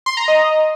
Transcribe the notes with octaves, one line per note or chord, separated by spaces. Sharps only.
C6
A#5
D#5